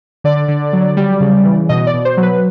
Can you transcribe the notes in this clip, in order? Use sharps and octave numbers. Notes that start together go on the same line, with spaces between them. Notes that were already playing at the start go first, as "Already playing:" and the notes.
D3 D5
D3
F#3
G3
C#3
E3
B2 D#5
D5
B2
C5
F#3
B4